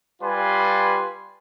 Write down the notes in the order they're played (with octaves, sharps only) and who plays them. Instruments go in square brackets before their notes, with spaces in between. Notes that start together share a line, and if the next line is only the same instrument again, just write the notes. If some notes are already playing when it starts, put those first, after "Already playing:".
[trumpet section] G3 F4 B4 G#5 C6